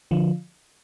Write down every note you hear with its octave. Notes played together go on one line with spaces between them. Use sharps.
D3 F3